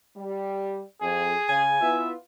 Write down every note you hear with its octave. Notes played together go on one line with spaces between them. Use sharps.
G3
F2 G#4
C#3 G#5
B3 E4 F4 E5